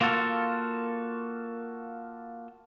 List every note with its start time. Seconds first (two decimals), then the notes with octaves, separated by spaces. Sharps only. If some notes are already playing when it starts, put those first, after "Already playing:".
0.01 A#3 F4 F#4 A4